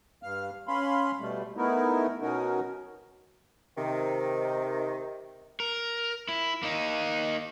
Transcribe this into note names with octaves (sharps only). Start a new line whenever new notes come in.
G2 F5 F6
C#4 F5 B5 C6
B2 G3 A3
A3 B3 D#4 E4 A#4
B2 C#4 D#4 F#4 A#4
C3 D#3
A#4
E4
A#3 D#4